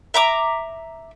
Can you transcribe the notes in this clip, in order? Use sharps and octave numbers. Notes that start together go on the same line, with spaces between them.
E5 A#5 D6